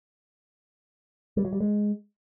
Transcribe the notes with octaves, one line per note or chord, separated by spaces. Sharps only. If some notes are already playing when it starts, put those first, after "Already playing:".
G3
F#3
G3
G#3